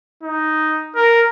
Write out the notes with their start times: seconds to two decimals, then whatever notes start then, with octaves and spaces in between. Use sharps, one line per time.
0.23 D#4
0.96 A#4